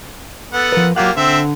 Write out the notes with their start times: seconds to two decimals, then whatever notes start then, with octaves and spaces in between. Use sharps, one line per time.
0.53 B3 A4 F#5
0.72 F3 A#4 B4
0.96 F#3 A#3 F4 G4 F#5
1.17 D3 C4 E5